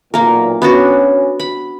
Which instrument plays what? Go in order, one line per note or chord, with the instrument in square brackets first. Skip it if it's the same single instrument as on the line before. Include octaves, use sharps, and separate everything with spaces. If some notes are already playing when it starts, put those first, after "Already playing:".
[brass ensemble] B1 E2 A#2 [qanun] A#3 A#4
[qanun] B3 D4 F#4 [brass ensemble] C#4
[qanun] B5